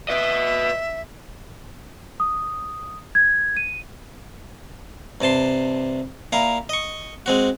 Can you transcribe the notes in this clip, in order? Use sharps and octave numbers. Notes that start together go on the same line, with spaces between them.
B4 D#5 E5
D#6
G#6
D#7
G2 C3 A5 C6
A#2 E4 F5 A#5
D#5 C#6
G#3 C4 F#4